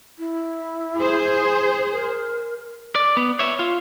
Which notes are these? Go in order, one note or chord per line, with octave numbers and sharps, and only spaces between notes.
E4
G#4 C5
A#4
D5
B3
C#5 E5
F4